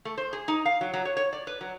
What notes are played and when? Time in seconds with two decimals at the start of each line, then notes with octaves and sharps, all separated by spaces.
0.05 A3
0.18 C5
0.33 G#4
0.48 D#4
0.65 F5
0.81 F#3
0.94 F#3
1.05 C#5
1.17 C#5
1.33 D5
1.47 B4
1.61 F#3